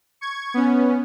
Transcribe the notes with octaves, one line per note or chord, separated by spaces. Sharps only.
C#6 G#6
B3 C#4